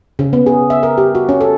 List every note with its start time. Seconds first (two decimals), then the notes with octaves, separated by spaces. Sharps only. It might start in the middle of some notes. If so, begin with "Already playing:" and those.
0.19 C#3
0.33 B3
0.46 G#4
0.70 E5
0.83 A#4
0.98 G4
1.15 F#4
1.29 C#4
1.41 A4